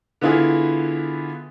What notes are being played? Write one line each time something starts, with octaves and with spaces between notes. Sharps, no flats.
D3 B3 E4 F4 G#4